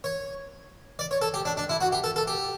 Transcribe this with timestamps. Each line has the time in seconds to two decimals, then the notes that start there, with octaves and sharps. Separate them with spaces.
0.04 C#5
0.99 D5
1.11 C#5
1.22 A4
1.34 G4
1.45 D4
1.57 D4
1.69 E4
1.81 F#4
1.92 G4
2.04 A4
2.16 A4
2.28 G4